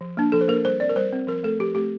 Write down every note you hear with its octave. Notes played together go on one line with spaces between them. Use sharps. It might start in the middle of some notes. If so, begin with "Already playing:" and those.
F3
A#3 D4
F3 A4
C5
A#3 D4 A#4
G3 C5
C4 D5
A#4
G3 C5
C4
F3 A#4
A3 C4 A4
F3 G4
A3 C4 G4